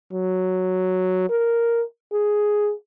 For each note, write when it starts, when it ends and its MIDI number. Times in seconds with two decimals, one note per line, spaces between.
0.13 1.28 54
1.30 1.82 70
2.13 2.72 68